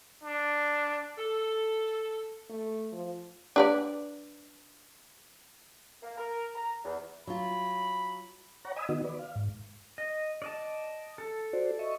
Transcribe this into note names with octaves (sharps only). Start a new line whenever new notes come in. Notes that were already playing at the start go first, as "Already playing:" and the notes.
D4
A4
A3
F3
D4 B4 D5
A#3
A#4
A#5
E2
F#3 F4 B5
C#5 F#5 A#5
D#5 G#5 B5 D#6 E6
D#3 B3 F#4 D#5
B4 D5
F5
G#2
D#5
D5 D#5 A5
A4
F#4 C5 D5
D#5 E5 C#6